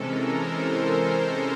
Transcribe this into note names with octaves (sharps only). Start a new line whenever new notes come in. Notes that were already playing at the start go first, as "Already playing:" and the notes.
Already playing: C3 E3 G#3 C#4 A4 A#4
C5